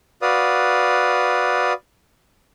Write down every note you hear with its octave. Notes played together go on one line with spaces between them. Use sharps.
F#4 B4 D5 F5 D#6